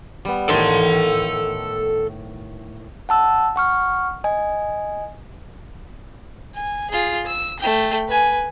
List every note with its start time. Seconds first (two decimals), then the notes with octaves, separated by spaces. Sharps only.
0.25 G3 B3
0.49 A2 D#3 A4 A5 C6
3.09 F#5 A5 E6
3.56 F#5 C#6 F6
4.24 D#5 G#5
6.55 G#5
6.91 F4 G#4
7.27 E6
7.60 A3 G5
8.08 B4 G#5